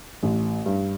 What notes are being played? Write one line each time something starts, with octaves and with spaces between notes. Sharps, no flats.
A1
G2